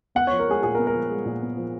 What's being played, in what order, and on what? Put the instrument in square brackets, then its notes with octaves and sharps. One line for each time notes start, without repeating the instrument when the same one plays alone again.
[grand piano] B3 F#5
F3 C#5
A#4
G#3 G#4
A#2 G#4
A#4
B3
A#4
F3
G#3
A#2
B3
F3